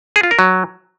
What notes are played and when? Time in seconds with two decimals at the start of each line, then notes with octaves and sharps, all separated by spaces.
0.16 G#4
0.23 F4
0.31 A#4
0.39 F#3